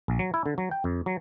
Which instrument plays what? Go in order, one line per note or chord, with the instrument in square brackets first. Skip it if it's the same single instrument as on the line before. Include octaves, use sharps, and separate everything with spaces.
[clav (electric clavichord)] A#1
F#3
E4
D3
F#3
G5
F2
F#3